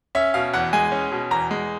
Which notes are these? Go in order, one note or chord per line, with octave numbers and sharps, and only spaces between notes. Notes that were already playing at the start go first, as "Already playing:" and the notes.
C#4 E5
B2 F5
E2 F#5
G#3 G#5
C#4
B2
E2 A#5
G#3